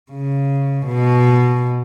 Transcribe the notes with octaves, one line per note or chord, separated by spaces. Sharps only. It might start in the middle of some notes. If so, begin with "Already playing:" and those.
C#3
B2